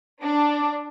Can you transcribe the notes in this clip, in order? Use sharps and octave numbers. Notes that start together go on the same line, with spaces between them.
D4